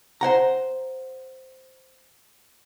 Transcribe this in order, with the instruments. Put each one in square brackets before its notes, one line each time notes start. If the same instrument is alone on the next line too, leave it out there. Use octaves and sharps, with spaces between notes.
[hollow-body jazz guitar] C5 F#5 A#5